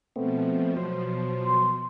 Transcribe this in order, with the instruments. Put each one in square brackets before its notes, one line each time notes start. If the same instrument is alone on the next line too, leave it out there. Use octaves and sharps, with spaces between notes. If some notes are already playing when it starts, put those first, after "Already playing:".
[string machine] B2 F3 [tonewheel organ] A3 B3 C4
[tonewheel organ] F#3 C5
[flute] C6